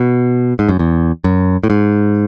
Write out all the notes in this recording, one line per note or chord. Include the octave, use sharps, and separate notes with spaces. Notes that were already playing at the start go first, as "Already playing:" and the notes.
Already playing: B2
G#2
F#2
E2
F#2
A2
G#2